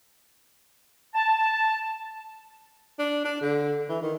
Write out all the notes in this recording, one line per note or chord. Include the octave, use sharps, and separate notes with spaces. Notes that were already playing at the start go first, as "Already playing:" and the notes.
A5
D4
D4
D3
E3
D#3